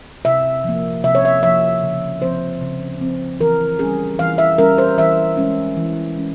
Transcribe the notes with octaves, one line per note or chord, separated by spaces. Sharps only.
C3 E5
F3 A#3
C3 E5
C#5
E5
F3 A#3 E5
C#3
F3 C4 C5
C#3
F3 C4
E3 A#4
G3 C#4 G#4
E3 F5
E5
G3 C#4 A#4
C5
E3 E5
G#3 C#4
E3
G#3 C#4